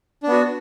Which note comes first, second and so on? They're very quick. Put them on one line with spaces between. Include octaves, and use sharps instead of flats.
D4 B3 F#4